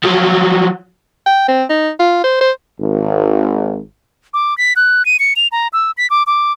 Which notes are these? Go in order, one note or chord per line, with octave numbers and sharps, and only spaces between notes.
F3 F#3
G5
C4
D#4
F4
C5
C5
G#1
D6
B6
F#6
D#7
C#7
F7
A#5
E6
B6
D6
D6